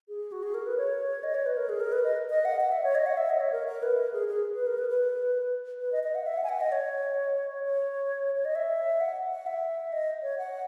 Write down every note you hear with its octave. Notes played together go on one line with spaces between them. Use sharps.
G#4
F#4
G#4
A#4
B4
C#5
D#5
C#5
B4
A#4
G#4
A#4
B4
D#5
D#5
F#5
F#5
E5
C#5
D#5
F#5
E5
D#5
C#5
A#4
A#4
B4
A#4
G#4
G#4
B4
A#4
B4
B4
B4
D#5
D#5
F#5
E5
F#5
G#5
F#5
D#5
C#5
C#5
C#5
D#5
E5
F#5
F#5
E5
D#5
C#5
F#5